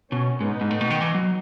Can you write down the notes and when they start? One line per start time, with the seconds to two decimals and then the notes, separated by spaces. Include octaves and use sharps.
0.11 B2 C#4
0.41 G#2 B3 D#4
0.61 G#2
0.71 A2
0.81 B2
0.90 D#3
1.01 E3
1.15 F#3